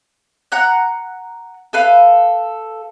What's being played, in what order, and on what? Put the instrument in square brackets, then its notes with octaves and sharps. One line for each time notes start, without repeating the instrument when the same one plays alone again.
[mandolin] F#5 A#5 F#6
A4 B4 F5